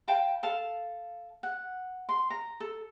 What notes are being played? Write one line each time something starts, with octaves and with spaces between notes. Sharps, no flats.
F5 G5 A5 B5
A4 F5 A5
F#5
C6
A#5
A4